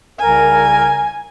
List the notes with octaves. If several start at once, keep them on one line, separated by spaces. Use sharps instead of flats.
C2 C#3 A#4 G#5